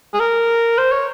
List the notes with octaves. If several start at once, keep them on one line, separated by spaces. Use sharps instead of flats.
G#4
A#4
C5
C#5